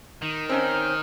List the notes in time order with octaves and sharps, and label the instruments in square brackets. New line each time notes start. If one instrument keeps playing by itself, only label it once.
[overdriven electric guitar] D#3
[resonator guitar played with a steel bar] C4 C#4 D#4 [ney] C5 [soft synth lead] F6